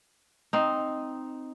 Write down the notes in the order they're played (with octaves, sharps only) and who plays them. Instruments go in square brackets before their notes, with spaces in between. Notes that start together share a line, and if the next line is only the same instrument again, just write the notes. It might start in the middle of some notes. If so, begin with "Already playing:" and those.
[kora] C4 D#4